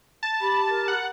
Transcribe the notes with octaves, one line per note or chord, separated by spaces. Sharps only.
A5
G4 B5
A#4
F#5